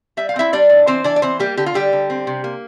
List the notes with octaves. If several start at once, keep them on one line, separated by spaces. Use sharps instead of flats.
G3 E5
F5
C4 E4 E5
G3 D4 D5
A2
E3 C4 C5
E3 D4 D5
D5
E3 C4 C5
G3 A#3 G4
D3 G4
F4
D3 G3 G4
D3
C4
C3
A#3